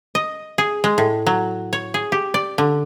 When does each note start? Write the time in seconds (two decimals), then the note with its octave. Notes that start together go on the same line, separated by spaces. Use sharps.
0.15 D#5
0.58 G#4
0.84 G#3
0.98 A2
1.26 F#3
1.73 C#5
1.94 G#4
2.12 G4
2.34 D5
2.58 D3